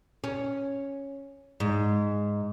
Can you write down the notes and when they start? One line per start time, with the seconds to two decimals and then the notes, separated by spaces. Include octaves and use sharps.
0.24 C#4
1.60 G#2